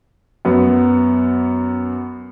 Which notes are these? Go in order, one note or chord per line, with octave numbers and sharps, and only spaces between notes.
F#2 B3